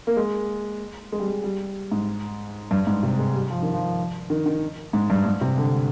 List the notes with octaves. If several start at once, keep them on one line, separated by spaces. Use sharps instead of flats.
A#3
G#3
G#3
G3
G#3
G3
G#2
G2
G#2
C3
G#3
G3
F3
D#3
F3
D#3
D#3
G#2
G2
G#2
C3
D3